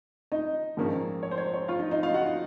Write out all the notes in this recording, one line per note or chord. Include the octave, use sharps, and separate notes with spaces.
D#4 D#5
A#1 G#2 F3 A#3 C#4
C#5
C5
C#5
C#5
F4 F5
D#4 D#5
D#4 D#5
F4 F5
F#4 F#5
D#4 D#5